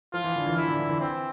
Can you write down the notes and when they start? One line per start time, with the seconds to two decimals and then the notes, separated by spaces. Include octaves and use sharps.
0.13 F3 F4
0.24 E3
0.36 D3
0.46 E3
0.56 E3 E4
0.68 D3
0.79 D3
0.89 E3
1.00 C4